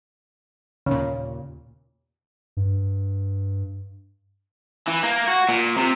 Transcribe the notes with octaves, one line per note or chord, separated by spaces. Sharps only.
D#2 A#2 C#3
G2
E3
A#3
F#4
A#2
C3